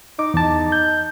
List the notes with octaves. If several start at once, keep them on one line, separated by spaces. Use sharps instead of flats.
D#4 D6
E2 A5
G6